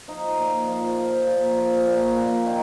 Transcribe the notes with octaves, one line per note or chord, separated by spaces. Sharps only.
F3 D#4
A#2
F3 F4
F3
A#2
F3
A#2
A#2
D#3